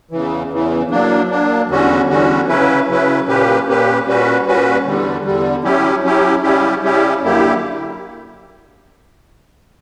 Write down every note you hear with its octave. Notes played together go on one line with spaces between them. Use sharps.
E2 C#3 E3
E2 C#3 E3
F#3 A#3 D4
F#3 A#3 D4
E2 D3 G3 C#4 F#4
E2 D3 G3 C#4 F#4
C#3 F#3 C#4 E4 B4
C#3 F#3 C#4 E4 B4
A#2 A#3 C#4 G4 B4
A#2 A#3 C#4 G4 B4
A#2 G3 C#4 F#4 B4
A#2 G3 C#4 F#4 B4
E2 D3 G3
E2 D3 G3
F#3 C#4 E4 G4
F#3 C#4 E4 G4
C#3 G3 C#4 E4 G4
C#3 G3 C#4 E4 G4
F#2 D3 A#3 E4 G4